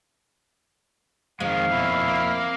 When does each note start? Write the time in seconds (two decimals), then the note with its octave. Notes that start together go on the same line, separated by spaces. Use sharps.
1.40 F2 D#3 G#3 F5
1.72 B2 A#3 E4
2.08 A#3